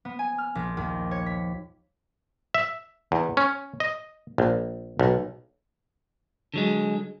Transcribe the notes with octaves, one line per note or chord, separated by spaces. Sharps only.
B3
G#5
F6
A#1
D#2
C#5
B6
E5
E2
C#4
D#5
A#1
B1
D3 F#3 G#3